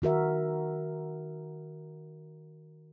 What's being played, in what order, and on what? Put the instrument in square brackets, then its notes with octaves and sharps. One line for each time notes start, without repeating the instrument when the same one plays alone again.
[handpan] D#3 F#4 A#4 E5